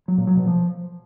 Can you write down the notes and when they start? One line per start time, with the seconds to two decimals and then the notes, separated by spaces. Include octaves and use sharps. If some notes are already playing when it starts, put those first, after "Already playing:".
0.08 F#3
0.18 A#2
0.27 F#3
0.37 B2
0.46 F3